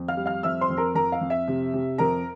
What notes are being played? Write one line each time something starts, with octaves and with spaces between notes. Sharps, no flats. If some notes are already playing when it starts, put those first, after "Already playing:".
Already playing: F2
F5 F6
G3
F5 F6
F2 E5 E6
C5 C6
F2
A#4 A#5
F2 A#4 A#5
F5
F2
E5
C3
C3
F2 A#4 A#5